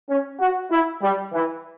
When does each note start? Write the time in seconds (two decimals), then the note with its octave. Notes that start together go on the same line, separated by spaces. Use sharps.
0.09 C#4
0.40 F#4
0.71 E4
1.02 G3
1.33 E3